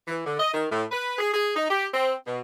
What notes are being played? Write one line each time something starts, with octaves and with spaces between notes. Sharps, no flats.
E3
D3
D#5
D#3
A2
B4
G#4
G#4
D#4
G4
C4
B2